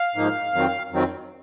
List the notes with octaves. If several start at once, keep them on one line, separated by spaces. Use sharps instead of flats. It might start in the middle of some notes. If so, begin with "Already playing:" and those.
Already playing: F5
G#2 F3 A#3 D#4
F2 D#3 F#3 C4
F2 D#3 F#3 C4